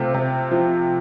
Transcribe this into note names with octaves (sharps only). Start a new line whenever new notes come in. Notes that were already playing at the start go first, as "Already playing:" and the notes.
Already playing: C3 A3 F4
C3
F3